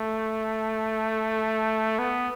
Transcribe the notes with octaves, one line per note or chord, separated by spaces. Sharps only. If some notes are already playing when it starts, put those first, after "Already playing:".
Already playing: A3
B3